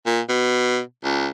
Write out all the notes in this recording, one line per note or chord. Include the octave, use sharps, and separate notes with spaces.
A#2
B2
C#2